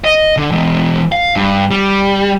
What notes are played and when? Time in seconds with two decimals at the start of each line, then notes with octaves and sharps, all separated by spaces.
0.04 D#5
0.37 D3
0.51 E3 G#3
1.12 F5
1.36 G2
1.71 G3